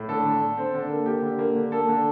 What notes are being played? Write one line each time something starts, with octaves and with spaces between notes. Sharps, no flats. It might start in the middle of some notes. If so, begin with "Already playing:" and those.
Already playing: A2
D3 A4
D3
D3
C4
D3
A#3
A#3 G4
D3
A#3
D3
A#3 A4
D3